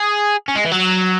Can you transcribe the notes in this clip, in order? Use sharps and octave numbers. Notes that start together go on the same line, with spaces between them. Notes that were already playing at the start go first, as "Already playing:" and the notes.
Already playing: G#4
C#4
G#3
E3
F#3